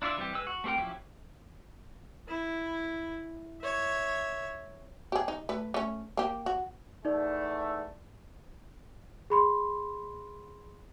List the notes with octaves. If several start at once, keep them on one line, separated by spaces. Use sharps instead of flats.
D4 E4 F4 D5 E5
E3 G3 C4 G4
G#3 B4 E6
F#4
A3 C4 G4 A#4 G5
F3 F#3 C#4 E4 G4
E4
C#5 E5
G4 G#4
D#4
A3 B4
A3 C#4
A#3 G4
F#4
E2 A3 D#4 D5
G#4 B5 C6